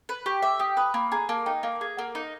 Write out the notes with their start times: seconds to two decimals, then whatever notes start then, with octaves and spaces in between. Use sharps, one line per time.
0.09 B4
0.26 G4 C#6
0.42 E5 D6
0.59 G4 D#6
0.77 B4 D#6
0.94 A#3 B5
1.12 G#4 A#5
1.29 A#3 A5
1.46 D#4 G5
1.63 A#3 F5
1.81 G#4
1.97 A#3 F#5
2.15 D#4